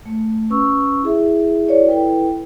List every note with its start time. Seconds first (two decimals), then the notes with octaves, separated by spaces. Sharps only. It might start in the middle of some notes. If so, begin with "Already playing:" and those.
0.06 A3
0.50 C#4 B4 C#6 E6
1.03 E4 G#4 E5
1.68 E4 F#4 B4 C#5 D5
1.88 E4 A4 B4 G5